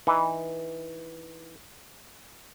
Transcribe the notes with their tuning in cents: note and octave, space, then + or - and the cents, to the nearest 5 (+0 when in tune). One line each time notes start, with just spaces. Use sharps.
E3 -10 D#4 -5